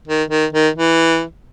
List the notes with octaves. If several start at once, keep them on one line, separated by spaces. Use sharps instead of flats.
D#3
D#3
D#3
E3